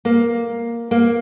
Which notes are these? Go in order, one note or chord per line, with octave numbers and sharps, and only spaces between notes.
A#3
A#3